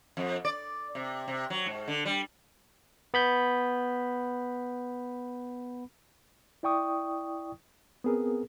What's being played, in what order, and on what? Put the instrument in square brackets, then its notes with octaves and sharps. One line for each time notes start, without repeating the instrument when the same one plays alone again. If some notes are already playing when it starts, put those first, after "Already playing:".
[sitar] F2
D5
C3
C3
F#3
G#2
D3
G3
[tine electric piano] B3 B5 G6
[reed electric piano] E4 D5 G5 C#6 D#6
B3 C4 G#4 A#4